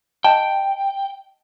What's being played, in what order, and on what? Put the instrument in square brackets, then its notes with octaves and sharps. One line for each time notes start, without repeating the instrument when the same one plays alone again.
[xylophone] D#5 A5 [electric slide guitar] G5